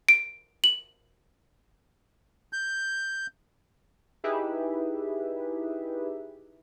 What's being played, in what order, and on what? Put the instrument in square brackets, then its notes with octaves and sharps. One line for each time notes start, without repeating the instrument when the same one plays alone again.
[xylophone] D7
F#7
[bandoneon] G6
[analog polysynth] D#4 E4 G4 G#4 B4 E5